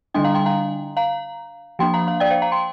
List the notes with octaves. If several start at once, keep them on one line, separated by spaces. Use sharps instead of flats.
D3 G3 D4 G5 C6
F5 A#5
G5 C6
F5 A#5
F5 A#5
F3 A#3 D4 G5 C6
F5 A#5
F5 A#5
D5 G5
C5 F5
F5 A#5
G5 C6